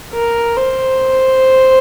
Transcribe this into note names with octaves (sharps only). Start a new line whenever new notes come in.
A#4
C5